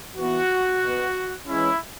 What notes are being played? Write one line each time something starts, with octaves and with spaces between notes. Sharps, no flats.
E3 B3 F#4
B2 B3
E3 G#3 C#4 E4